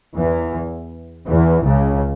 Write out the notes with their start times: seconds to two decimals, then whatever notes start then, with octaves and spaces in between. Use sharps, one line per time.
0.15 E2 E3
1.26 E2 E3
1.64 C#2 C#3